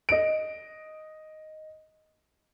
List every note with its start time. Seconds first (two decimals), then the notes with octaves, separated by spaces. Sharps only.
0.09 D#5 D7